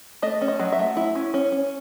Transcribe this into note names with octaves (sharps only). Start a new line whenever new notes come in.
A3 D#5
C#4
D#5
F#3
E5
A3
E4
C#4
C#4
C#4